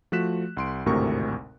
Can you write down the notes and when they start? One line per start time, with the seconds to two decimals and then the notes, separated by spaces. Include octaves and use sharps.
0.12 F3 A3 F#4 F#6 B6 E7
0.57 C2 C6 D7
0.86 G#1 D2 A2 C3 A#4 C#6